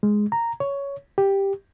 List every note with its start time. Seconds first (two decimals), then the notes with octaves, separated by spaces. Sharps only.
0.03 G#3
0.32 A#5
0.60 C#5
1.18 G4